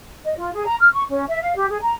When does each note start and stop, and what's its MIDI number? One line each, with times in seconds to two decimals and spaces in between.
0.25 0.33 75
0.37 0.53 65
0.54 0.65 68
0.66 0.75 82
0.80 0.88 89
0.92 1.03 85
1.09 1.25 61
1.28 1.38 76
1.41 1.54 77
1.55 1.68 67
1.69 1.78 68
1.81 1.94 82